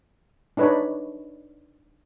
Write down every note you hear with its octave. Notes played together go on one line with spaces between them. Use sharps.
D4 D#4 B4 C#5